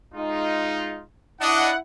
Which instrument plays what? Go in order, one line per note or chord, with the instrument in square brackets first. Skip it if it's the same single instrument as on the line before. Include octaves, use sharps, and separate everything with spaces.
[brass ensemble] G#3 D#4 F4
[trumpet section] D4 D#5 [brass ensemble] E4 F#5